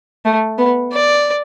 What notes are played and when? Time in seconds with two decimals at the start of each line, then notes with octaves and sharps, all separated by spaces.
0.25 A3
0.58 B3
0.92 D5